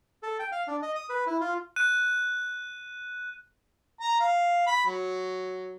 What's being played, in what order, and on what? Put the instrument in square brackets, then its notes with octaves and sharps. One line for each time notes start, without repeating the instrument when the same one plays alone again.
[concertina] A4
G5
F5
D4
D#5
D#6
B4
E4
F4
[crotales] F#6 D#7
[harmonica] A#5
F5
B5
F#3